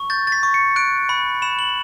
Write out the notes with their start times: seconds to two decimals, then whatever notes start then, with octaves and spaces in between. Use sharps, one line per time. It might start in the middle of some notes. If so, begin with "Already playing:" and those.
Already playing: C#6
0.10 G6 A6
0.27 A6
0.32 B6
0.43 C#6
0.54 C#7
0.76 F#6 D7
1.09 B5
1.42 B5 E7
1.59 F#7